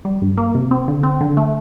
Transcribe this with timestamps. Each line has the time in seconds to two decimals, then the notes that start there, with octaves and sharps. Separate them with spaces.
0.05 G3
0.22 G2
0.37 A#3
0.55 C3
0.71 C4
0.88 D3
1.03 C4
1.21 D3
1.37 A3